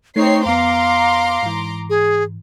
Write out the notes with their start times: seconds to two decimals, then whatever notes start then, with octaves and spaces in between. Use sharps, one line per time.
0.16 A3 C4 D#4 C#5 C7
0.46 F2 B3 F5 A#5 C6 D6
1.43 G#2 E3
1.90 G#4